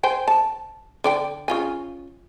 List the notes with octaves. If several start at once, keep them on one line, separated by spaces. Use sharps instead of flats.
C5 G5 G#5
A5
D3 D5 G5
C#3 F4 G#5